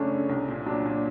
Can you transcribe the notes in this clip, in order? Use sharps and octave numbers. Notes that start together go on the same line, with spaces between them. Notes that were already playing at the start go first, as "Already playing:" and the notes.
Already playing: F#2 C#3 A3 C#4 D4
C#3
C2
A#2
F#3 D4
A#2